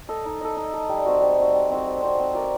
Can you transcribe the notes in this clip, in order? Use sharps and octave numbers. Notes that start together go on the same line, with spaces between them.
A4 D#5
D#4
A4 D#5
D#4
A4 D#5
G3
C4 F#4
G3
C4 F#4
G3
C4 F#4
G3
C4 F#4
C4
F#4 A#4 D5